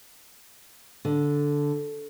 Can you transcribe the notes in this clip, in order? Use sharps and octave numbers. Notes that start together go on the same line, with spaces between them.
D3